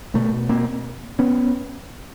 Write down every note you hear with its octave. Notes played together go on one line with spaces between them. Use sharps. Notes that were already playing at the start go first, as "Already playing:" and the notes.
B2 A3 B3
A#3 C4
B3 C#4